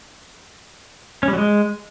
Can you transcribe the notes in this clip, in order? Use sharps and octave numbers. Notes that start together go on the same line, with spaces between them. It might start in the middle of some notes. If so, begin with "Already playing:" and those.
C#4
G3
F#3
G#3